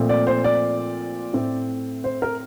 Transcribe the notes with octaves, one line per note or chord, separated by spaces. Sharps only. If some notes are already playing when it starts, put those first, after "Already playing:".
Already playing: A#2 F3 A3 C4
D5
C5
D5
A2 A3 C4
C5
A#4